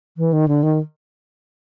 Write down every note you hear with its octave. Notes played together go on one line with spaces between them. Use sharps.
E3
D#3
D3
D#3